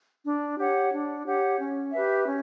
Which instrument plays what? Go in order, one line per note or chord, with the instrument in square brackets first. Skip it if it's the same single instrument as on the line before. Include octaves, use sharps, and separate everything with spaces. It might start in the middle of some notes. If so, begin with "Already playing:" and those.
[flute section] D4
G4 C#5 F#5
D4
G4 C#5 F#5
C#4
G4 B4 E5
C#4